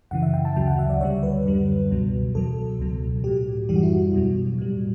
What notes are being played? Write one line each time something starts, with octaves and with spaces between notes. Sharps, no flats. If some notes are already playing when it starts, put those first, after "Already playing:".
F#2 C#3 E3 F#5
E5
G5
A5
D2 C#3 F#3 G5
F#5
E5
D5
D2 D3 G3 C#5
B4
F#2 D3 G3
C#2 B2 F#3
E2 B2 F#3 A4
C#2 B2 F#3
A2 F#3 G4
F#2 E3 G3 G4
F#4
E4
F#4
E2 B2 F#3
A2 G3